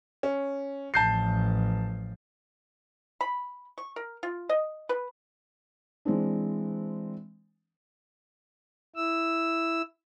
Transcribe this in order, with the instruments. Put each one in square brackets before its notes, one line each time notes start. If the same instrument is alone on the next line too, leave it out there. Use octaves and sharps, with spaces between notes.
[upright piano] C#4
[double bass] A1 F3 [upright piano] A5 G6 C7
[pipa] B5
C#6
A#4
F4
D#5
B4
[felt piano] E3 G#3 C4 D4
[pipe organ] E4 E6